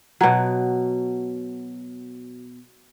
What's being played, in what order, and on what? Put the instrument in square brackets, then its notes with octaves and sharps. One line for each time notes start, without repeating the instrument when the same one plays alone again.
[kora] B2 F#3